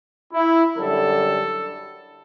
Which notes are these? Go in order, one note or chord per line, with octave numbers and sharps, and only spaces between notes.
E4
F#2 D3 G3 A4